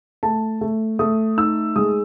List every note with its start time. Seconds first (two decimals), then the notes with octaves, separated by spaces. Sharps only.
0.23 A3 A5
0.61 A3
0.99 A3 D#6
1.37 D#4 E6
1.76 G#3 D#6